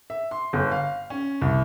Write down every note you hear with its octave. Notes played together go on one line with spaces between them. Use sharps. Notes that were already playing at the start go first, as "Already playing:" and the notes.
E5
C6
G1
F5
C#4
C2